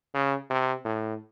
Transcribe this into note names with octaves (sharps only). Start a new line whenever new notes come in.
C#3
C3
A2